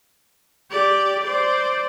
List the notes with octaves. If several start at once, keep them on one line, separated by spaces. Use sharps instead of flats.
G4 D5
C5 D5